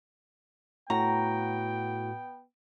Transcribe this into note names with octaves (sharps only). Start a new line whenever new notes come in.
A2 B3 F#4 G5 A#5